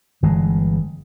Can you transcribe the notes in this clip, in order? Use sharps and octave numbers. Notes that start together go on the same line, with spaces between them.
G1 E3 G#3